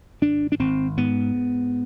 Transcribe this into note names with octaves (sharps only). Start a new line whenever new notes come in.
G#1 D4
D4
G#1 C4
G#2 B3
G#2